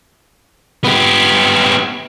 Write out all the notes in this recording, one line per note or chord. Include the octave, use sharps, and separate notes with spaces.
B3 G4